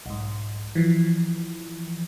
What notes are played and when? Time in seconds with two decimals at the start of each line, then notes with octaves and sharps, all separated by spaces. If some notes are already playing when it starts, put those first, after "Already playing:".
0.06 B1 G#2
0.75 E3 F3